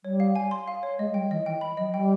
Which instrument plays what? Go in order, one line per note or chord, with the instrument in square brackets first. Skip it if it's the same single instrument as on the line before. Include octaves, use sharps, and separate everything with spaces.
[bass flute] G3 [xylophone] C#5
[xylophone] F5
G#5
C6
F5
C#5
[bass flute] G#3 [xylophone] D#5
[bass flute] G3 [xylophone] G5
[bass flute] E3 [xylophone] D#5
[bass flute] E3 [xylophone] G5
[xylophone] B5
[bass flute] F#3 [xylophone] D#5
[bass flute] G3 [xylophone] G5